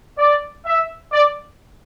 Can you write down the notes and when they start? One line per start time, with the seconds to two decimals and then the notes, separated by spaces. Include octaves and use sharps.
0.18 D5
0.66 E5
1.12 D5